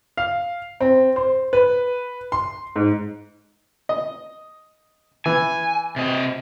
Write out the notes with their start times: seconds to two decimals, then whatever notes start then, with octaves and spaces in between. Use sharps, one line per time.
0.17 F5
0.80 C4
1.16 C5
1.53 B4
2.32 C6
2.76 G#2
3.89 D#5
5.26 E3 G#5
5.96 C3 D#5